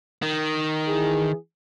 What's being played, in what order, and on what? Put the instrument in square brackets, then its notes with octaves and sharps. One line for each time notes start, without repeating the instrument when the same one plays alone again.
[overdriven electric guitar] D#3
[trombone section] E3 G#4